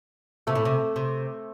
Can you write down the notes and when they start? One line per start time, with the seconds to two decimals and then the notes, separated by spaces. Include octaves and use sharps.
0.47 C3 A3
0.55 A2
0.65 C3
0.96 C3